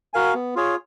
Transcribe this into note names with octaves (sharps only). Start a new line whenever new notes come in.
F#4 A#4 F5 G#5
B3
F4 G#4 C#5